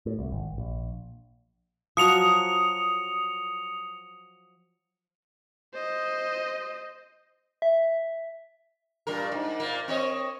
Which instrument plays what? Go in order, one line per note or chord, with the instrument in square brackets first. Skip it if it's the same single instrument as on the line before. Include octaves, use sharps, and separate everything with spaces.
[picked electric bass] A2
C2
G#1
A#1
[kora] F3 F#3 F#4 [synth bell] D#6 C#7 F7
[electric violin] C5 D#5
[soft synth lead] E5
[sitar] G2 A#2 A#4
G#2
A#2 A#3
C4 C#5 D#5